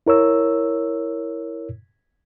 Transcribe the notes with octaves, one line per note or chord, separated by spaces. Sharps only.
E4 A#4 C#5 E6